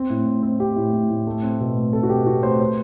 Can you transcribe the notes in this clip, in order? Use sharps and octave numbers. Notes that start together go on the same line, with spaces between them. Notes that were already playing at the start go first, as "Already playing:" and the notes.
Already playing: C4
A2
A2
C4
C4 G4
A2
A2
A2
A3
C4
B2
A3
C4 A4
F#4
B2 G4
C4 F#4
A3 C5
B3 C5